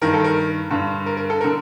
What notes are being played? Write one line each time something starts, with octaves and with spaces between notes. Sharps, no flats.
G2 D#3 A#4
A4
A#4
G2 D3
A#4
A#4
A4
D3 A#4